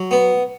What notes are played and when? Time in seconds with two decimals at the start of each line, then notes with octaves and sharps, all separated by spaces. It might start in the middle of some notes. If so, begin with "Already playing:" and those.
Already playing: F#3
0.11 B3